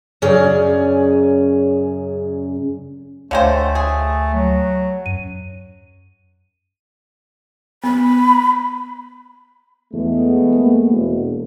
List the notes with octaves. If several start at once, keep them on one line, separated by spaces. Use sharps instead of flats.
F#2 C#3 C#4 G#4 D5
D2 D3 G#3 A3 C5 C#5 F5 G5
G#4
F#3
F#2 D#7
B3 B5
E2 G#3 A3 B3
A#3
E1